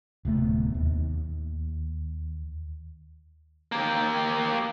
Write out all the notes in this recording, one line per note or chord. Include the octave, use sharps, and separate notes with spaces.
D1 C3 A3 B3
D#2
A#3 G4